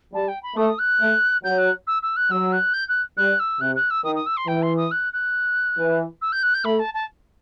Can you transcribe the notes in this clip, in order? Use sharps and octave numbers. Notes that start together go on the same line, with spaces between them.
G3 A5
G5
B5
A3 D#6
F#6
A3
F#3 G6
F#6
E6
E6
F#6
F#3 E6
F#6
G6
F#6
G3 F#6
E6
C3 F#6
F#6
E6
D#3 D#6
D#6
E6
C6
E3 G5
C6
D#6
F#6
F#6
E3
E6
G6
F#6
G6
A3 B5
A5
A5